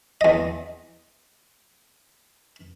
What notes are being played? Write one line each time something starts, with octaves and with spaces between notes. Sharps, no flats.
E2 D#5